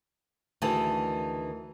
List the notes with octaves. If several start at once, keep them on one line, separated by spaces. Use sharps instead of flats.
D2 D#3 E3 G#4 A5